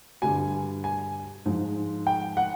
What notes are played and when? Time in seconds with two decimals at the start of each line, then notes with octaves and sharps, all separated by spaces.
0.22 G2 D3 G3 G#5
0.84 G#5
1.46 G#2 F3
2.07 G5
2.37 F#5